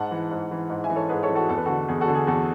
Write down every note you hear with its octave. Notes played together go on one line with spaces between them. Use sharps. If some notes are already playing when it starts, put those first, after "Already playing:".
Already playing: G#2 F#5 A5
E3
G#2
E3
G#2
E5 G#5
E3
A4 C#5
G#2 G#4 B4
A4 C#5
E3
F#4 A4
E2 A4
B4
D3 F#4 A4
E2 G#4
F#4 A4
D3
G#4
E2 F#4 A4